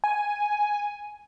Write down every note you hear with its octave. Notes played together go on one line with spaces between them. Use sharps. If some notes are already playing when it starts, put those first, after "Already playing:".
G#5